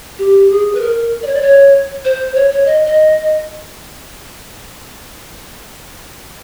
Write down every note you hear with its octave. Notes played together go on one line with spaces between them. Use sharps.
G4
G#4
B4
A#4
D5
C#5
D5
C#5
C5
C#5
C#5
D#5
D#5